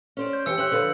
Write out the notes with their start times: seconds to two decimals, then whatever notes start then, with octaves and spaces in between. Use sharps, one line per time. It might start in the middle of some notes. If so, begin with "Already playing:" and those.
0.17 C#4 C5 D5
0.33 G6
0.46 E3 G4 E6 C#7
0.58 G4 C5 C#5 F#6 F#7
0.72 D3 F3 B4